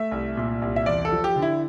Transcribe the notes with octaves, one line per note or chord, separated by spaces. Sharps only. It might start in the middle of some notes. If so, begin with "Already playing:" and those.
Already playing: A3 E5
C2
A#2
C2
E5
E2 D5
A4
F3
G4
D3
E4